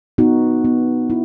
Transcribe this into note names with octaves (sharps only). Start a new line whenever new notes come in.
B3 D#4 F#4
B3
E4